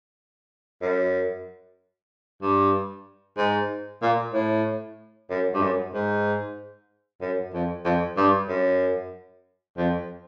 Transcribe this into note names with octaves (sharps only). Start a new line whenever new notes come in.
F#2
G2
G#2
A#2
A2
F#2
G2
F#2
G#2
F#2
F2
F2
G2
F#2
F2